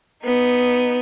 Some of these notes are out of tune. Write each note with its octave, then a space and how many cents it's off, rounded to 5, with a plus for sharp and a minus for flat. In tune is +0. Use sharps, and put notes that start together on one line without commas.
B3 +0 D#4 +0